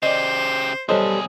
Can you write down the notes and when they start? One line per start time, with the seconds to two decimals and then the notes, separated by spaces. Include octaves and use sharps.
0.03 C#3 G4 C5 D5 D#5
0.89 B1 G3 G#4 A4 C5 C#5 D#5